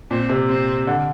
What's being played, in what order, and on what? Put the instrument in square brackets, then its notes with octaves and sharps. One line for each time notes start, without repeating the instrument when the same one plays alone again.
[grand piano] A#2 [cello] C4
[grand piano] C3
[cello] C4
[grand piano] D3